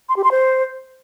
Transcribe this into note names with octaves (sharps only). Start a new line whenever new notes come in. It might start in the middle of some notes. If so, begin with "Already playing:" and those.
C6
G4
C6
C5